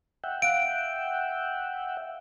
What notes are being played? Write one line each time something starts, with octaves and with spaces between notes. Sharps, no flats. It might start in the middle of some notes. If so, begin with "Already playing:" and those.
E5 F#5 G5
F5 F#6 D7